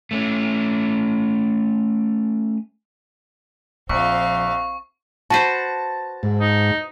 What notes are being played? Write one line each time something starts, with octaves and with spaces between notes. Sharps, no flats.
A3 C#4
A#1 F3 C4 F5 C#6
F#4 B4 C5 A5
G#2
D#4